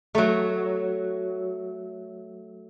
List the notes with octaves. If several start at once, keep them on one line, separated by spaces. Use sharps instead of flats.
F#3 A3